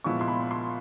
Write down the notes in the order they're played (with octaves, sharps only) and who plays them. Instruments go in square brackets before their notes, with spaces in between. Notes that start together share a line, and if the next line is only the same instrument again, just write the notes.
[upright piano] A#2 F3 G#3 B3 E4 C#6
C6
B5
C6